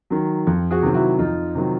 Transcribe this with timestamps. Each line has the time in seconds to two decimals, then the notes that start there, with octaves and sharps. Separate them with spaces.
0.10 D#3 F#3
0.47 F2
0.71 F#4 G#4
0.82 C3 D#3 F#3
0.94 E4 F#4
1.19 F2 D#4 F4
1.55 C3 D#3 F#3